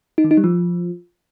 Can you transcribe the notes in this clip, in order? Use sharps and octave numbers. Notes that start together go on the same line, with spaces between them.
D#4
D#3
D#4
G3
F3